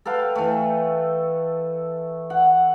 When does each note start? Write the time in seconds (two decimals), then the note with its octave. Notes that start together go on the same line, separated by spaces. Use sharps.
0.05 A4 B4 F5 G5
0.35 E3 A3
2.30 F#5